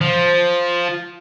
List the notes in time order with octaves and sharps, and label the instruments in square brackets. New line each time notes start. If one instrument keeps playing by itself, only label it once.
[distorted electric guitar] F3